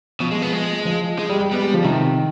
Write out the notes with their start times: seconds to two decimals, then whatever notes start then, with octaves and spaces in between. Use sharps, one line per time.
0.20 B2 F3
0.31 G#3
0.42 B3
0.53 G#3
0.85 F3
1.19 G#3
1.29 G3
1.40 G3
1.51 G3 B3
1.62 G#3
1.74 F3
1.84 C3 D#3